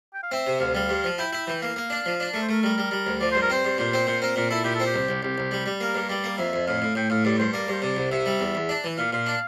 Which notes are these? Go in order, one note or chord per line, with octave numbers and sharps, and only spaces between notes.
G5
F5
C4 E5
C3
D2 F5
G3 F5
G2
F3
E4 G5
E4
E3 G5
A#3 F5
A#3
D4
F3
D4
A3 A#4
C5
A3 A#4
G3 A#4
G3
G3
D2
F3 D5
G2 C5
A#4
C4 C5
G2
A#2 C5
C4
A#2 C5
C4 A#4
A#2 A#4
E4 A4
A#2 G4
C4 A4
G4
C2
C2
C2 G4
C2
G3
G3
A#3 A#4
G2
G3 D5
A#3
F2 E5
F2
A2 F5
A2
A2 G5
A2 F5
G2 D5
G2 C5
A#3 D5
G2 C5
C3 D5
C2
C3 E5
G3
E2
E2
D4
E3
A#2 F5
A#2 F5
D4